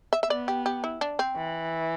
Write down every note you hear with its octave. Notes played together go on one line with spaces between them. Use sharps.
E5
E5
B3 D5
G4
G4
E4
D4
C4
E3